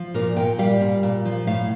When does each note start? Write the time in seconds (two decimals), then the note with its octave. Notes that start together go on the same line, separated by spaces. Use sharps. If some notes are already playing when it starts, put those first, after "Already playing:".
Already playing: F3
0.14 A#2 A#4
0.36 A#2 G5
0.59 G3 F5
0.81 A#2
1.03 A#2
1.25 F3
1.47 A2 F5